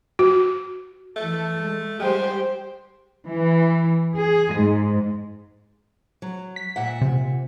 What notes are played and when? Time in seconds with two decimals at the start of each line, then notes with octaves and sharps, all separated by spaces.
0.19 F#4
1.16 E3 A3 A4
1.62 G#3
2.00 G3 G#3 G4 C5 G5
3.27 E3
4.15 G#4
4.54 G#2
6.22 F#3
6.56 B6
6.76 A#2 E5 F#5
7.02 C3